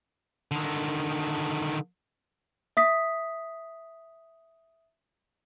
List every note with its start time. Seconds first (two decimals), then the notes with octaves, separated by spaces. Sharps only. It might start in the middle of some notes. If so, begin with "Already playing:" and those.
0.51 D3 D#3
2.77 E5 D#6 B6